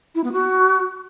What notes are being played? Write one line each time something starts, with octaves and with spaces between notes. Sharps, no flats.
E4
B3
F#4